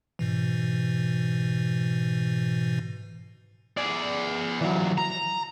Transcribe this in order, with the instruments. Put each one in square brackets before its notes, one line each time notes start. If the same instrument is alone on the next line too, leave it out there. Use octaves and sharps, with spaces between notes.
[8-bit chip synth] G#2 B2 E3
[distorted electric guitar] G#4 D5
E3 F#3
A#5